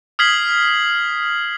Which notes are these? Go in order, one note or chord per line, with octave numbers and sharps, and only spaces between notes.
D#6 F6 G#6 B6 C7 F#7